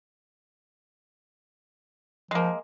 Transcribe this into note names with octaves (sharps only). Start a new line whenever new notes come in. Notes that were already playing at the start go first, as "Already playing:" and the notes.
F3 G#3 A#3